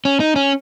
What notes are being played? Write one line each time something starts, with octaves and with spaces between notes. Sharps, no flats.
C#4
D#4
C#4